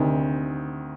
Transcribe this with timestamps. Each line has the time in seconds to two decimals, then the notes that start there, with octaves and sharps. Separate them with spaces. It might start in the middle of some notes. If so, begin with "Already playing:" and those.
Already playing: D2 C3 D#3